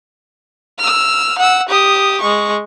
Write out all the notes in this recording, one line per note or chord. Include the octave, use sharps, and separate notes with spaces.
E6 F6
F#5 E6
G4 D#6
G#3 C#6